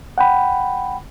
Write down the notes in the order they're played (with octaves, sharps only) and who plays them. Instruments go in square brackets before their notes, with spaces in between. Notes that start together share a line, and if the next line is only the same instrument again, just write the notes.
[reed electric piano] F#5 G5 B5